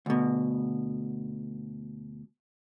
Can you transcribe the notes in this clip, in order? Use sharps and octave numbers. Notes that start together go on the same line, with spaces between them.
D2 B2